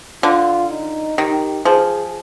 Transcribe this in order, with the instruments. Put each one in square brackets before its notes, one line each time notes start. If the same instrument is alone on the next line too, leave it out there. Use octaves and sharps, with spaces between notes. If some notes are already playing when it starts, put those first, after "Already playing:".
[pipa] D3 [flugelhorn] F4
[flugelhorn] D#4
[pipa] D#3 [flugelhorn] G4
[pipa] F3 [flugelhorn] G#4